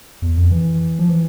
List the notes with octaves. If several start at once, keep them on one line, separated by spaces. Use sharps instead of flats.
E2
F2
E3
F3
E3